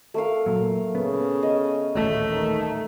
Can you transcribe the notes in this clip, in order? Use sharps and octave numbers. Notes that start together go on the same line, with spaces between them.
A3 A#4 F5
A#2 F#3
C#3 B3
D#5
D#1 A1 A3
D#3